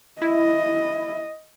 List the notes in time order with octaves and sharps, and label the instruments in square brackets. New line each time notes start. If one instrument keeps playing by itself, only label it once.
[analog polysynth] E4 [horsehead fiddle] D#5